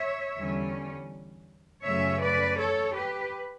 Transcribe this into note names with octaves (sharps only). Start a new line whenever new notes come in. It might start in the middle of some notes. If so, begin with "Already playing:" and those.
Already playing: C#5 E5
E2 D3 G3 C#4
F#2 C#3 F#3 A3 C#4 C#5 E5
B4 D5
A4 C#5
G4 B4